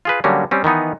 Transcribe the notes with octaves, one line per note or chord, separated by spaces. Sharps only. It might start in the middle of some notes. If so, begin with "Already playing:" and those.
F4 G#4 B4
D3 F#3 G3 A#3 C#4
G3 C4 C#4
D#3 E3 B3 D#4